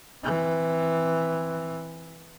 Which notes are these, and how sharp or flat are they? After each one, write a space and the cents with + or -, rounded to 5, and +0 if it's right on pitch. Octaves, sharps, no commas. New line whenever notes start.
E3 +0 C4 +0